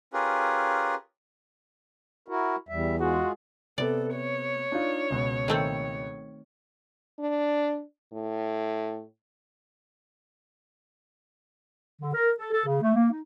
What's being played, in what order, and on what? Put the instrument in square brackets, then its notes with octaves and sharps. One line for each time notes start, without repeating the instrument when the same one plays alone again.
[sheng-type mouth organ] C#4 F4 G4 G#4 A#4 B4
[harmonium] E4 F#4 A#4
[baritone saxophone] E2 [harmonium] G3 E5
[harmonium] G#3 F4 G#4 [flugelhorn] F#4
[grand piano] C3 B3 [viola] A4 [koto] D5
[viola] C#5
[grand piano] D4 D#4 F4
C#2 B2
[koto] D#3 A3 C4
[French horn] D4
A2
[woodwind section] D3
A#4
A4
A4
C#3
A3
A#3
D#4